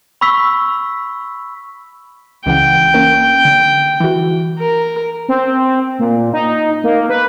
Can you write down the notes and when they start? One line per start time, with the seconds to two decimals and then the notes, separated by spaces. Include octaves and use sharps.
0.21 B5 C#6 E6 B6
2.46 C#2 E3 F#5 G5
2.94 A#3 C#4 A#4
3.45 D3
4.00 E3 F#4
4.59 A#4
5.29 C4
5.99 A#2
6.33 D#4
6.84 A#3
7.10 B4